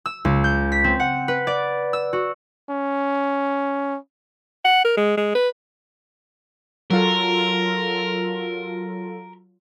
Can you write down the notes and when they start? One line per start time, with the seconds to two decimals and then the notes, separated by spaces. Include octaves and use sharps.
0.06 E6
0.25 C#2
0.44 G6
0.72 B6
0.84 C4
1.00 F#5
1.28 B4
1.47 D5
1.93 E6
2.13 F#4
2.70 C#4
4.65 F#5
4.85 A#4
4.97 G#3
5.17 G#3
5.35 B4
6.91 F#3 F4 A4 A#4